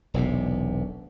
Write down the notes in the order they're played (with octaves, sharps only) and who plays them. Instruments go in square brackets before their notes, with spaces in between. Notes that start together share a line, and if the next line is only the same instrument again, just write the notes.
[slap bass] E1 B1 C3